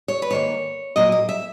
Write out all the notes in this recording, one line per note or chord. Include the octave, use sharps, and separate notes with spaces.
C#5
B4
G#2 D#3 A#3 C#5
A#2 F#3 A#3 D#5
D#5
E5